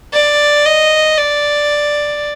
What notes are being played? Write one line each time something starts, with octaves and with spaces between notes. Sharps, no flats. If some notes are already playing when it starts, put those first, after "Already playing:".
D5
D#5
D5